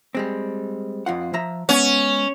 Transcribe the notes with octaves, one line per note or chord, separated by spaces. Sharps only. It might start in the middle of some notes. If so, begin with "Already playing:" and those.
G3 G#3 C4
F2 F4 F#5
F3 E5 A#5
G#3 B3 C#4 F#5